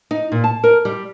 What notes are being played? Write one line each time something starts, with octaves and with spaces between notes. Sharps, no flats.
D#4
A#2
A5
A#4
G3